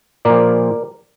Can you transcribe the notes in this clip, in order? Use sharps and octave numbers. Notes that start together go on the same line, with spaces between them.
A#2 F3 A#4 D5